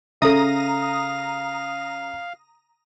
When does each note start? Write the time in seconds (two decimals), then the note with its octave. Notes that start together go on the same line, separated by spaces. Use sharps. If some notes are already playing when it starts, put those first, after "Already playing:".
0.22 C#3 A4 E5 F5 A#5 D#6